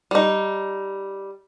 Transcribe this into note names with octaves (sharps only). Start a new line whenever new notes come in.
G3 D#4